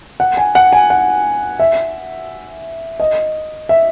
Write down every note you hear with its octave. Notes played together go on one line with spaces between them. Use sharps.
F#5
G#5
F#5
G#5
F#5
E5
D#5
E5